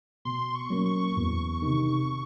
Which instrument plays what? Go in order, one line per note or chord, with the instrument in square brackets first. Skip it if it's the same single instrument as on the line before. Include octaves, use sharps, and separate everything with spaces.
[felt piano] B2 [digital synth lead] C6
[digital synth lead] C#6
[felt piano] F#3 A#3 C#4
[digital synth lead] C#6
[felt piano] E2
C3 D#3